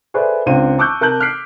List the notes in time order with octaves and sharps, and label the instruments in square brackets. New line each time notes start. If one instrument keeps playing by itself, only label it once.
[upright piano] G#4 A4 B4 C5 D5 E5
C#2 C4 D4 D#7
A5 C#6 D6 E6 F#6 G6
C3 A#4 A5 G6 F#7
F6 F#6 B6 C7 D7